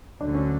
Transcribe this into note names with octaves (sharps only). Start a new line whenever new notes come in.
D2 D3 F#3 D4
C#4